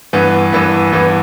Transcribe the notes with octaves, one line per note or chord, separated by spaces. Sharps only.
G2 E3 B3
G2 E3 B3
G2 E3 B3